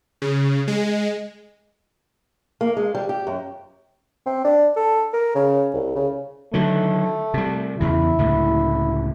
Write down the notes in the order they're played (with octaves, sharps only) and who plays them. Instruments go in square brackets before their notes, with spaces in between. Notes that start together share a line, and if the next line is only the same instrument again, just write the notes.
[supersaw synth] C#3
G#3
[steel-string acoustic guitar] A#3
G#3
G3
G4
F#2
[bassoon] C4
D4
A4
A#4
C#3
C2
C#3
[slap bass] D3 D#3 F#3 [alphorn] A3
[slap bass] C3 G3
[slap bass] E2 C#3 [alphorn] E4
[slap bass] C#2 A2 D3